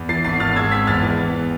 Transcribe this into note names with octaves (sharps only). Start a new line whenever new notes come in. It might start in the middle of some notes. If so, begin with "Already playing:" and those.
Already playing: E2
E3 A6 C7
G#1 A6 C7
G#1 F6 A6
G#3 E6 G#6
C4 G#6 B6
E2 F6 A6
E3
B3